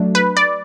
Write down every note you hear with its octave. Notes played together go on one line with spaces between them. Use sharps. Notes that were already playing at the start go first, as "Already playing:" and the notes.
Already playing: F#3 A3 D4
B4
D5